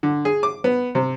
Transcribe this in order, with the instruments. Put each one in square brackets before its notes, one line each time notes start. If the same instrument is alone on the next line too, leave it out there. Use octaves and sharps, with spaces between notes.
[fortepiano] D3
G#4
D6
B3
C3